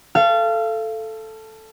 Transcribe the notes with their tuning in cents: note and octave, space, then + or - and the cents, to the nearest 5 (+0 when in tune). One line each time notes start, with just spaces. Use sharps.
A4 +0 F5 -30